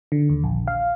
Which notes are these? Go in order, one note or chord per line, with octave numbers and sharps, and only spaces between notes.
D3
D#2
A#1
F5